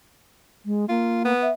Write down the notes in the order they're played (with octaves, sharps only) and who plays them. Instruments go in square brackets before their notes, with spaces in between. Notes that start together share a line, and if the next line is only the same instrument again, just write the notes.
[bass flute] G#3
[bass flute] A#3 [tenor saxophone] F4
[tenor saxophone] B3
[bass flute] E5